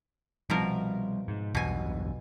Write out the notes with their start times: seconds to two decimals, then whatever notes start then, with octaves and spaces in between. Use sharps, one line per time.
0.50 B2 F3 G3 C4 A#4
1.28 G#2
1.55 B1 E2 G2 B2 G#5